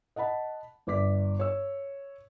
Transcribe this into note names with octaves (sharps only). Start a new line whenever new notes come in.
D#5 F#5 A5 B5
G1 D5 D6 B6
C#5 E6